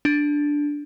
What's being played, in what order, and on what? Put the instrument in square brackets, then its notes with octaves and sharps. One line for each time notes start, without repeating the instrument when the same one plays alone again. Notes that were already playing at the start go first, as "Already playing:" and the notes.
[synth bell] D4